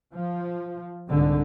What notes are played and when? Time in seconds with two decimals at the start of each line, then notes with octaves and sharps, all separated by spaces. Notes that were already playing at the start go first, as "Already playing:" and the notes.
0.14 F3
1.08 C2 G#2 D3